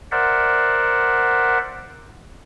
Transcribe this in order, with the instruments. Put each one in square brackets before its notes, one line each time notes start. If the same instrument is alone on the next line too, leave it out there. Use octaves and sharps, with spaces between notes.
[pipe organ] A#4 C5 D5 E5 F#5